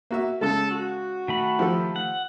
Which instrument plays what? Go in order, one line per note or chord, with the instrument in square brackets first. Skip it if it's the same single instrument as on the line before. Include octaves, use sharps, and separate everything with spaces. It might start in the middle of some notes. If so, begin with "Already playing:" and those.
[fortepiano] A#3 F#4 E5
[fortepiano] C#3 G#3 [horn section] A4
[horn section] F#4
[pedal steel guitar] D#3 A3 B5
[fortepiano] F3 G4 A4
[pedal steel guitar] F#5